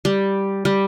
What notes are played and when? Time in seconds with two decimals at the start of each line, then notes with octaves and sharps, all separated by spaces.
0.05 G3
0.65 G3